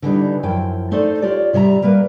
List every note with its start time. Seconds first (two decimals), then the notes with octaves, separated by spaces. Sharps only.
0.02 D3 E3 G3 D#4
0.43 F#2 F3 E4 G5
0.91 A3 D#4 A4 C5 D5
1.22 F4 G4 C#5 D5
1.53 C3 G3 C#5 E5 A#5
1.82 G3 A#3 A#4 B4